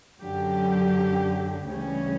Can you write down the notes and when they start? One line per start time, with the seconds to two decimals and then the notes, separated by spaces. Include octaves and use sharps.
0.20 F#2 D3 F#3 G4
1.68 D2 C#3 E3 G3 C#4